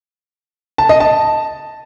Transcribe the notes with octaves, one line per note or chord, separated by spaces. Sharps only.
A5
D#5
A5